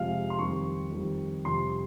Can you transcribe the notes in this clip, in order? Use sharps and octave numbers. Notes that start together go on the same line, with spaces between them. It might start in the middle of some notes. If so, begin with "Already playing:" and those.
Already playing: F2 C3 F3 G#3 F5
C6
F2 D#3 G3 C#6
F2 D#3 G3
F2 C3 G3 C6